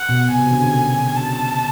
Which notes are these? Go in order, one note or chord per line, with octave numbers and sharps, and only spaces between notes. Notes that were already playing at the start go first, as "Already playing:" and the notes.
Already playing: F#5
B2
C3 G#5
C3
D3
C#3
A5